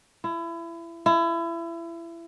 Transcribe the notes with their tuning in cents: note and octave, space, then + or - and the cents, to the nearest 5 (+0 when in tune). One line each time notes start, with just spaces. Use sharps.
E4 +30
E4 +30